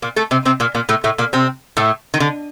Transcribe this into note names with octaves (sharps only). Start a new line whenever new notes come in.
A#2 A#3
A3 A4
C3 C4
C3 C4
A#2 A#3
A#2 A#3
A2 A3
A2 A3
A#2 A#3
C3 C4
A2 A3
D#3
D3